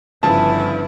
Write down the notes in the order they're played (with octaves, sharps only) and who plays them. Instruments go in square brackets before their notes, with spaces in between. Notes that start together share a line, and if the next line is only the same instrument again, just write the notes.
[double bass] G1 E4 [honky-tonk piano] C#3 F3 [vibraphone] B4 [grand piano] A5